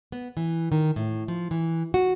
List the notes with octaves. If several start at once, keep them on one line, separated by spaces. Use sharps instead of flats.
B3
E3
D#3
A2
F3
E3
F#4